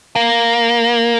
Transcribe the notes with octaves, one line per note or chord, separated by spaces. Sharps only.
A#3